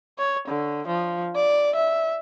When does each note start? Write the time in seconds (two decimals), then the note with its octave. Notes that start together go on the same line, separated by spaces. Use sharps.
0.18 C#5
0.48 D3
0.88 F3
1.35 D5
1.75 E5